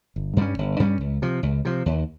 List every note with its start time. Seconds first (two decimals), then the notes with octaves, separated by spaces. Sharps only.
0.16 G1
0.37 G2 G3 C#4
0.59 G1
0.80 G2 G3 C#4
1.01 C#2
1.22 C3 F3
1.43 C#2
1.65 C3 F3
1.86 D#2